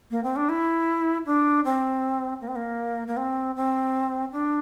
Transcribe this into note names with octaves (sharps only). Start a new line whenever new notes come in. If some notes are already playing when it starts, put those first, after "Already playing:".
A#3
C4
D4
E4
D4
C4
A#3
C4
A#3
A#3
C4
C4
D4